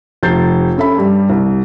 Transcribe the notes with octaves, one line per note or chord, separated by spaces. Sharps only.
F1 G6 A6 C7
C#4 A4 E5 B5
G2 G3
C2